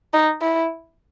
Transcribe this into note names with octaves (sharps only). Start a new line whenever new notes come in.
D#4
E4